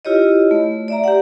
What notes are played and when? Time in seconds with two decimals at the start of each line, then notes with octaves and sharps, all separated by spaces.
0.05 E4 F4 G4 C#5 D#5
0.51 A3
0.88 D5 E5 A#5
1.04 G4 F#5